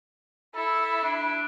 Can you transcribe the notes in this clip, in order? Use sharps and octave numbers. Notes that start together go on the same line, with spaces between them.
E4 A4
D4